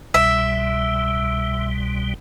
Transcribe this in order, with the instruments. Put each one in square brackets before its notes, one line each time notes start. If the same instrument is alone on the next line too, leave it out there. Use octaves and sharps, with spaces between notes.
[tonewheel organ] C2 B2 G3 [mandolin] E5